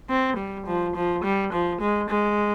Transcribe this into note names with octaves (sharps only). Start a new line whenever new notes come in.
C4
G3
F3
F3
G3
F3
G#3
G#3